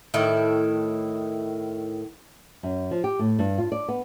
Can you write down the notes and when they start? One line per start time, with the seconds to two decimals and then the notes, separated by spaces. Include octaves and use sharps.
0.14 A2 D#3 E4
2.63 F#2
2.91 F3
3.04 G4
3.19 A2
3.39 G2
3.58 F4
3.72 D5
3.88 B3